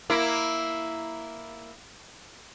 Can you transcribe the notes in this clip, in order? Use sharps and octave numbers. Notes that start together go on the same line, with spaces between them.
A#3 E4